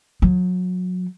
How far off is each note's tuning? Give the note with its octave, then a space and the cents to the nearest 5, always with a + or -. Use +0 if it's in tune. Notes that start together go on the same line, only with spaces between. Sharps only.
F#3 -25